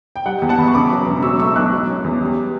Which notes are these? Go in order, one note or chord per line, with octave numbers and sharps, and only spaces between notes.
G5
G3 F#5
E2
F#5 A5
E2 B5
C#6
C#3 B5 D6
F#3
E1
F#3 C#6 E6
A3 C#6 E6
B1 D6 F#6
F#3
C#4
E2
G3